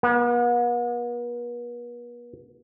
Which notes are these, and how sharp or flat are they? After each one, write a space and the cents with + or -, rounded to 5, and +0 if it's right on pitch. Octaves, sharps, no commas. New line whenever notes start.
B3 -45